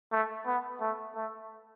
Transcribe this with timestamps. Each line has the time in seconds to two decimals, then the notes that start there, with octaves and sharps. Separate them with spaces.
0.12 A3
0.46 B3
0.81 A3
1.16 A3